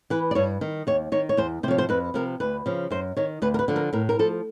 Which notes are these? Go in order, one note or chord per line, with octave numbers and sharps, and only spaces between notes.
E3 B4
D5
G2 C#5
D#3
D#2 C#5
D#3 C#5
C#5
E2 C5
C3 F3 C5 C#5
C5
F2 B4
C3 F3 A#4
D2 B4
C#3 F3
F#2 C5
D#3 C#5
D2 B4
A#4
B4
D3 F3
A#4
A2 A#4
A#4
F3 A4